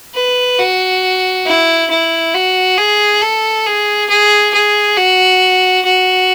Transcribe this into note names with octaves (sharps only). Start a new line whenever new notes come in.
B4
F#4
E4
E4
F#4
G#4
A4
G#4
G#4
G#4
F#4
F#4